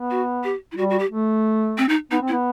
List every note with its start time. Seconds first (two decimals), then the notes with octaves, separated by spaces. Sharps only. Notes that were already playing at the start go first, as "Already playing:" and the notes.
Already playing: B3
0.11 F#4
0.44 G4
0.72 E4
0.76 G3 F#4
0.90 F#4
0.99 G4
1.11 A3
1.78 C4
1.89 D#4
2.11 B3 D#4
2.22 C4
2.28 E4
2.32 B3